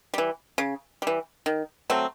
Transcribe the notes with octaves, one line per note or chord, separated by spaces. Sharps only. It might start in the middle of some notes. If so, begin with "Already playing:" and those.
E3 G3
C#3
E3 G3
D#3
F#3 A3 C4